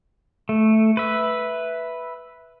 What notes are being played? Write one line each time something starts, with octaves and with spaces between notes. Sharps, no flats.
A3
B4 E5